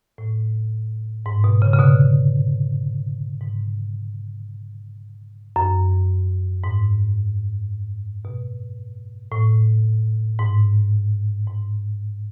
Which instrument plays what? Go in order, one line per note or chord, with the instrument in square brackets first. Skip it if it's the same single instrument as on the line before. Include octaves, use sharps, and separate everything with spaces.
[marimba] A2
G#2
B2
C#3
C#3
B2 D3
G#2
F#2
G#2
B2
A2
G#2
G#2